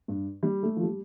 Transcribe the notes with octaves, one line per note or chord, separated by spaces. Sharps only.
G2
G3
A3
F3
G3